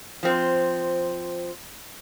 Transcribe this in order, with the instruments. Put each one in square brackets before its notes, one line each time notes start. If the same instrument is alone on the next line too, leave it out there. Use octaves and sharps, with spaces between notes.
[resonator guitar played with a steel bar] F3 C4